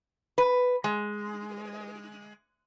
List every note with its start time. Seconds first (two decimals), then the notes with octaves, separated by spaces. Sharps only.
0.38 B4
0.84 G#3